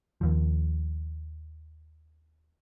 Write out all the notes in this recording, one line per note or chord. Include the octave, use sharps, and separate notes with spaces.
D#2 F3